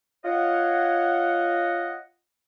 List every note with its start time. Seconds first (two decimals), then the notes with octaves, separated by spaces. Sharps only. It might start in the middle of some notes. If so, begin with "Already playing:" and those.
0.25 F4 C#5 D#5 F#5